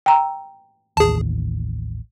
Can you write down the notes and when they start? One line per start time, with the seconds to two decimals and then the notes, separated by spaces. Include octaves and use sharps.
0.06 G5 A#5 E6
0.97 A1 D#2 G#4 A5